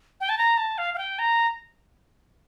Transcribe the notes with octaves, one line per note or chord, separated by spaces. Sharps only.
G5
A5
A#5
A5
F5
F5
G5
A#5